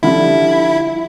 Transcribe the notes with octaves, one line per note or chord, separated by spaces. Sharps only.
D3 F3 G3 E4